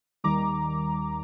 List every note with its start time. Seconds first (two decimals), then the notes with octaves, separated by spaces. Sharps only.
0.24 D#2 D#3 G3 A#5 D6